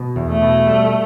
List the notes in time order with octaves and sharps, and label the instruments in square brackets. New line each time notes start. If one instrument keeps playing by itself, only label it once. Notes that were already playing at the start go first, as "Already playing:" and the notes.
Already playing: [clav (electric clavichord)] B2
E2
[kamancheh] A3
[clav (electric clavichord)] B2
G3